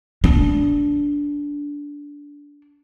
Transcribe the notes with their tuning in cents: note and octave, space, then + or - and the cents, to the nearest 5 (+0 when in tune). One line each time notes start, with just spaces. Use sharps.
D4 -15